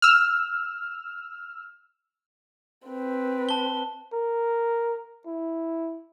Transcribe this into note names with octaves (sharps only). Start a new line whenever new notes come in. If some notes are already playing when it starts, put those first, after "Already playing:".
E6 F6
C4 B4
A5 G7
A#4
E4